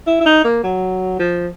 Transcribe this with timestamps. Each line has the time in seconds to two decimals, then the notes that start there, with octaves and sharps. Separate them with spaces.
0.07 E4
0.21 E4
0.26 D#4
0.44 A#3
0.64 F#3
1.19 F3